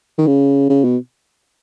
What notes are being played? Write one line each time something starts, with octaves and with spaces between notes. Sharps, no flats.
D#3
C#3
C#3
B2